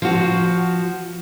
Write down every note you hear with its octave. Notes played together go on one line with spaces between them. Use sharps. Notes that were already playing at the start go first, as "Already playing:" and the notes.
F3 F#4